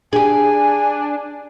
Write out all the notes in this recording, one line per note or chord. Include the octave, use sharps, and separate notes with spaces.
D4 G4 G#4 G#5